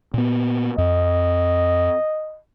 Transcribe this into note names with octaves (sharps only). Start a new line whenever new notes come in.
A#2 B3
F2 D#5